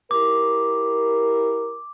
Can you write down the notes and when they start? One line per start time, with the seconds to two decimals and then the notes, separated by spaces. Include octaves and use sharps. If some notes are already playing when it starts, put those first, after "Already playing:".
0.11 E4 G4 A#4 D6